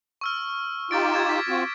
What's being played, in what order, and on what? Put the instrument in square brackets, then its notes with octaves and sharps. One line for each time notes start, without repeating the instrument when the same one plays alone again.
[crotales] C#6 E6 F6
[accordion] D#4 F4 G4 [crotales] D6 A6 D7
[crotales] G#6 A6 E7
B6
[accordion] C4 F4 F#4